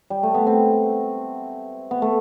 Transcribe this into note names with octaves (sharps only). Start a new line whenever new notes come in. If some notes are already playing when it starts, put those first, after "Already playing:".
G3
A3
B3
C4
B3
A3